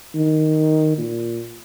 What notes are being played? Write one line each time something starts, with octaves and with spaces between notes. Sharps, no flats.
D#3
A#2